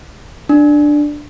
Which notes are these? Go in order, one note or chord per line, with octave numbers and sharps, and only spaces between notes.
D4